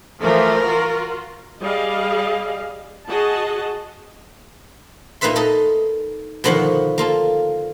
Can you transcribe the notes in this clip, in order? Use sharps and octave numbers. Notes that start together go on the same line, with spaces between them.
E3 F3 A3 A#4
F4 F#4
G3 G#4 D#5 F5
F#4 G#4 D#5 A5
A#2 A#3 D#4 B4 E5 C6
D#4 A4 D#5
B2 D3 D#3 F3 A#3 B3
A#3 F4 A4